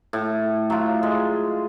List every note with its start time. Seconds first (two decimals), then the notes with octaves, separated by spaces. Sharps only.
0.13 A2
0.70 F#3 F4
1.03 G#3